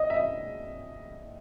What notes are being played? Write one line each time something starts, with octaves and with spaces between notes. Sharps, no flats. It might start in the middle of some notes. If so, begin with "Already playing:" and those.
Already playing: D#5
E5
D#5